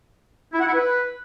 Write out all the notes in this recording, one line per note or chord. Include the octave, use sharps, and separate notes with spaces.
E4
F#5
E4
B4